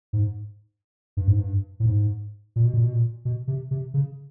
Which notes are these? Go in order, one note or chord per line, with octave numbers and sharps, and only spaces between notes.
G#2
G2
G#2
G2
A2
G#2
A#2
B2
A#2
B2
A#2
B2
C3
C3
C#3